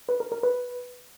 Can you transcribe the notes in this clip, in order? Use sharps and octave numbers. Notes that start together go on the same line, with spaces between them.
B4
A#4
A#4
B4